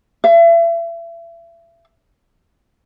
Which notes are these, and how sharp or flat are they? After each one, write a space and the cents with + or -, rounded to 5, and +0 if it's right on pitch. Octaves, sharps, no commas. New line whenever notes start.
E5 +35